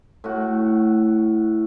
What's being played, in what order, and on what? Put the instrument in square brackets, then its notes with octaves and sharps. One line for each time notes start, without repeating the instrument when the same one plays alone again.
[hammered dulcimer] A2 F#4